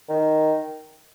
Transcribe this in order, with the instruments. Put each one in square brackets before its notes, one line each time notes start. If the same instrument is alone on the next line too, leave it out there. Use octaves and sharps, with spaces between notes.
[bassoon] D#3